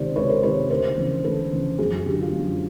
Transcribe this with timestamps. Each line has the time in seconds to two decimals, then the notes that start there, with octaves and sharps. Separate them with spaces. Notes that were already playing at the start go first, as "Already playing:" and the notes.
Already playing: C#2 C3 D#3 C5 D5
0.16 C#2 B4 C#5
0.29 A#4 C5
0.43 C3 D#3 B4 C#5
0.70 D2 A#4 C5
0.97 C#3 E3
1.24 D2 A4 B4
1.51 C#3 E3
1.78 F#2 F#4 G#4
2.06 D3 G4
2.14 F#4
2.21 F4 G4
2.32 F#2